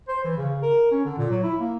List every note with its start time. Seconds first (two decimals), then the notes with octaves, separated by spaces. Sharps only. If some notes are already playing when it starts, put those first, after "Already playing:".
0.08 C5
0.24 E3
0.38 C#3
0.62 A#4
0.91 C#4
1.05 D3
1.18 A#2
1.30 F#3
1.43 E4
1.59 A#3